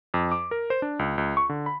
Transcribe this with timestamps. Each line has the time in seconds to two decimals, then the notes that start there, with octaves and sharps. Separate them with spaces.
0.14 F2
0.32 D6
0.51 A#4
0.70 C5
0.82 D4
0.99 C#2
1.18 C#2
1.37 C#6
1.49 D3
1.66 B5